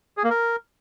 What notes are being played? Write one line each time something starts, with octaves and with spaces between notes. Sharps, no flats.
G#4
A#3
A#4